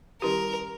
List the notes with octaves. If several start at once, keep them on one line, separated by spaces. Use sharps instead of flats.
D#3 G3 C#4 E4 G4 A#4